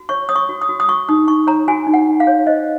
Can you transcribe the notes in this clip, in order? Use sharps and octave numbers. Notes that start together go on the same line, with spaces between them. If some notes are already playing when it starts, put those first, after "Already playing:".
Already playing: F#4
C#5 C#6
C#5 D#6
C#6
F#4
D#6
F#4
D#6
F#4 C#6
D#4 D#6
D#4 C#6
C#5 A#5
F#4 G#5
D#4
F#5
D#4
F5
C#5
C5 D#5